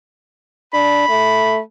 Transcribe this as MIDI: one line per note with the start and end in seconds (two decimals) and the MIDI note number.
0.74 1.08 62
0.74 1.59 83
1.09 1.60 57